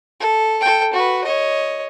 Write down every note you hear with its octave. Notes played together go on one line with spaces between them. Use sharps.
A4
A4 G5
F#4 B4
C#5 D#5